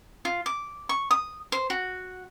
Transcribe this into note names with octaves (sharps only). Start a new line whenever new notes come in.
F4
D6
C#6
D#6
C5
F#4